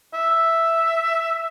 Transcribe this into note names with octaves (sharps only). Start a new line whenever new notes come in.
E5